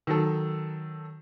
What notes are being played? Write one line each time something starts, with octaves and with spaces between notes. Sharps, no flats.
D#3 F#3 A4